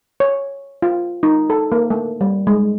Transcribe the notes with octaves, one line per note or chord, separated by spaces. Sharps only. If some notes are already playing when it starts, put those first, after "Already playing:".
C#5
F4
D#4
A4
A#3
A3
G3
G#3